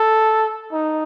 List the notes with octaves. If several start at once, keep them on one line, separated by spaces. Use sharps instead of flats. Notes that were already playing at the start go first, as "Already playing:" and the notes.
Already playing: A4
D#4